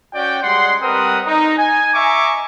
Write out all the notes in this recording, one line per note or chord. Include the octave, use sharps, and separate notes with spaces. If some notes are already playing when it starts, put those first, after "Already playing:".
C#4 F#4 D5 G5
G3 G#3 F#5 C6
G3 C4 A#4 B4 F#5 D#6
D#4
G#5
D#5 E5 G#5 A#5 C#6 D6